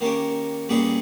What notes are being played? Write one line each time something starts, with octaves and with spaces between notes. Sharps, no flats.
D#3 A#3 C#4 G4
A#2 G3 C#4 G#4 B4